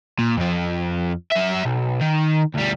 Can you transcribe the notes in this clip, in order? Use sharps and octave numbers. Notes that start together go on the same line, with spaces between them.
A#2
F2 F3
F#2 E5
B1
D#3
D2 G3